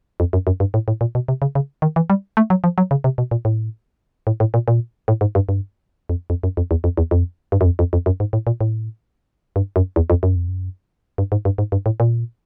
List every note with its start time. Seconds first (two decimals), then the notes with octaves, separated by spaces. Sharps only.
0.20 F2
0.33 F#2
0.47 F#2
0.60 G2
0.74 A2
0.88 A2
1.01 A#2
1.15 B2
1.28 C3
1.42 C#3
1.55 C#3
1.82 D#3
1.96 E3
2.10 G3
2.37 A3
2.50 F#3
2.64 F3
2.78 F#3
2.91 C#3
3.04 C3
3.18 B2
3.31 A#2
3.45 A2
4.27 A2
4.40 A2
4.54 A#2
4.68 A#2
5.08 A2
5.21 G#2
5.35 G2
5.49 G2
6.09 F2
6.30 F2
6.43 F#2
6.57 F2
6.71 E2
6.84 F2
6.97 E2
7.11 F2
7.52 G2
7.61 F#2
7.65 F2
7.79 F2
7.93 F2
8.06 F#2
8.20 G#2
8.33 A2
8.47 A#2
8.61 A2
9.56 G2
9.76 F#2
9.96 E2
10.10 F2
10.23 F#2
10.36 F2
10.48 F#2
11.18 G2
11.32 G#2
11.45 G2
11.58 G#2
11.72 G2
11.86 A2
12.00 A#2